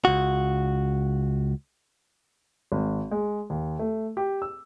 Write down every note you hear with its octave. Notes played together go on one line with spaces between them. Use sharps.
C#2 F#4
G#1
G#3
D#2
A3
G4
E6